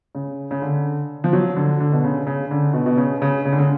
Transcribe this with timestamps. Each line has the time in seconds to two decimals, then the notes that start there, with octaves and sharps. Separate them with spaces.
0.15 C#3
0.51 C#3
0.62 D3
1.24 F3
1.33 F#3
1.56 D3
1.80 D3
1.92 B2
2.04 C#3
2.27 C#3
2.51 D3
2.73 B2
2.86 B2
2.97 C#3
3.22 C#3
3.45 C#3
3.52 D3
3.59 C#3